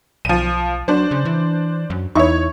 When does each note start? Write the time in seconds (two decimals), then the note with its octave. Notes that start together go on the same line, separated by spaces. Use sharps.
0.25 B1 F3 D#7
0.88 F#3 D4 C5
1.11 C#3
1.25 E3
1.90 F#2
2.15 E2 D#4 E4 C#5 C#6